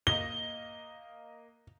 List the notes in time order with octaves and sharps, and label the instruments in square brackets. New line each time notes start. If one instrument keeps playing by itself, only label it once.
[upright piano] A#3 D#5 A#6 [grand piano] G7